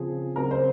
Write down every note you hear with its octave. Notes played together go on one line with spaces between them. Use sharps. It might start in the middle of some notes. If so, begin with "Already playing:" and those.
Already playing: C#3 F3 C4 G#4
C#3 F#3 C4 A#4
C5